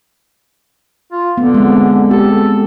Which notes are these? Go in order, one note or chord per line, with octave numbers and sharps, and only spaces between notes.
F4
D3 B3
G#3 C4
G4 A4